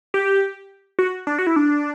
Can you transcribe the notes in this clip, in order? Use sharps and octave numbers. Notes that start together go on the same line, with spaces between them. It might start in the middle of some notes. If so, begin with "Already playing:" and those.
G4
F#4
D4
F#4
E4
D4